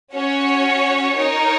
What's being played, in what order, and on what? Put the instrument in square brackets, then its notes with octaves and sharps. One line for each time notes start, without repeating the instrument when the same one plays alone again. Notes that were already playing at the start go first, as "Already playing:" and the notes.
[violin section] C#4 F#4 C#5
D#4 A#4 C#5